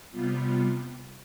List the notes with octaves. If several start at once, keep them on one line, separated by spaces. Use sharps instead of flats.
C3 G3 B3 F4